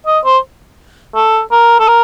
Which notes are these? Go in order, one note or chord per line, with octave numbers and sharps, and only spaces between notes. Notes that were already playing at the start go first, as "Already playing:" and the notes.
D#5
C5
A4
A#4
A4
A#4